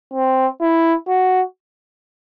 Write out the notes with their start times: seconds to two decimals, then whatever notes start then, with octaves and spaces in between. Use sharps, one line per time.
0.14 C4
0.61 E4
1.08 F#4